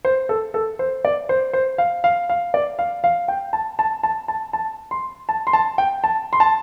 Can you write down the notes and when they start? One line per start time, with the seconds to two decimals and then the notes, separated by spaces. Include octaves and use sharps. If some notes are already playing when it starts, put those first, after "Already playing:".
0.05 C5
0.29 A4
0.54 A4
0.79 C5
1.05 D5
1.29 C5
1.53 C5
1.78 F5
2.04 F5
2.29 F5
2.54 D5
2.79 F5
3.04 F5
3.28 G5
3.53 A5
3.79 A5
4.03 A5
4.28 A5
4.53 A5
4.91 C6
5.29 A5
5.47 C6
5.53 A5
5.78 G5
6.04 A5
6.33 C6
6.40 A5